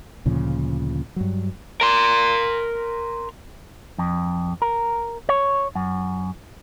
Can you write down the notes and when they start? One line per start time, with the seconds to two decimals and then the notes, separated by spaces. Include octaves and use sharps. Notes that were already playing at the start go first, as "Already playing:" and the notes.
0.26 D2 A#2 C#3 F3
1.16 G2 F#3
1.81 A#4 C6
3.98 F2
4.62 A#4
5.29 C#5
5.75 F#2